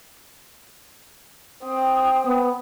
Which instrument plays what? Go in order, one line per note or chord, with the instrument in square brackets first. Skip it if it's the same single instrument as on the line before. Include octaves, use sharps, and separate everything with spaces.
[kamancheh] C4 [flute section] G5 D#6
[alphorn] B3